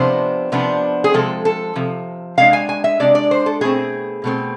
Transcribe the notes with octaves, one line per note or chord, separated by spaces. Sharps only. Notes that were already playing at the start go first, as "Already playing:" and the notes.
Already playing: C3 F3 B3 D4 C5
C3 F3 B3 D4
G#4
C3 F3 G#3 C4 A4
A4
C3 F3
C3 G#3 D4 F5
G#5
G#5
E5
C3 G#3 D4 D5
D5
C5
A4
B2 A3 C4 G#4
B2 A3 C4